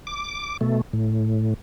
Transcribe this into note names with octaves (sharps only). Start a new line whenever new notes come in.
D6
B2 A3
A2